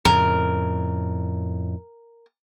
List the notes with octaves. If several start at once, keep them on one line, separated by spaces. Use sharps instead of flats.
F2 A2 C#3 A#4